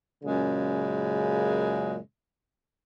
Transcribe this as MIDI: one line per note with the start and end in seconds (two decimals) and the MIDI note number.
0.23 1.98 42
0.23 1.98 46
0.23 1.98 49
0.23 1.98 56